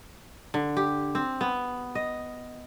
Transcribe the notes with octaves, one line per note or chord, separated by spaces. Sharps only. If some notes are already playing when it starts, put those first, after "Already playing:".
D3
G4
C4
B3
D#5